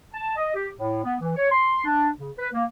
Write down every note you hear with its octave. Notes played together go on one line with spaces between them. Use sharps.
A5
D#5
G4
A2
B3
E3
C#5
C6
D4
C#3
B4
A#3